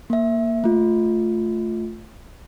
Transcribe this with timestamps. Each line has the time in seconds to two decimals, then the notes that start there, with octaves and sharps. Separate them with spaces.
0.10 A#3 E5
0.64 A3 F4